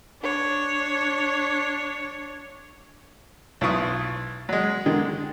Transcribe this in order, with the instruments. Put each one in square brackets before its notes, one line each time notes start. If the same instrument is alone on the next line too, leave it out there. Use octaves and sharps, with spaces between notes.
[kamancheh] D4 C#5
[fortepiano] B1 E4 F4 C#6 D#6
F#3 G#3
D3 D#3 G#3